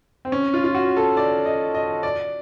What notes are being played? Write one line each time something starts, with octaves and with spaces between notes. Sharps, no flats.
C4
C#4
F4
F4
F#4
A4
D5
D#5
D#5
D5